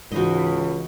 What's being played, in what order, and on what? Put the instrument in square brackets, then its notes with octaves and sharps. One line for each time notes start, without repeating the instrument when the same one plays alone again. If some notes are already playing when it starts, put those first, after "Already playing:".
[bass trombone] C#2 [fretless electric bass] G#2 [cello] E3 [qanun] F#4 C5 D#5